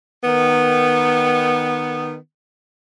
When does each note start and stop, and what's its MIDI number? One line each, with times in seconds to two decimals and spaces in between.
0.23 2.14 51
0.23 2.14 59